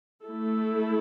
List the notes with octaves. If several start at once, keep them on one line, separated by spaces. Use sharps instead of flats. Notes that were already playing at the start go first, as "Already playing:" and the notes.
A3 E4 A4